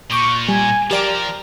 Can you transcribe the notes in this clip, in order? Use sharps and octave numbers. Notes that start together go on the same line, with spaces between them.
A#2 C#6 D6 G6
G3 G#5
F3 G4 A#4 D5 D7